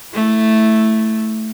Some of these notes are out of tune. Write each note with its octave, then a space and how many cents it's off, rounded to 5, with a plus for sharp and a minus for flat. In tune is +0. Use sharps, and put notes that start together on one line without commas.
A3 +0 E4 +0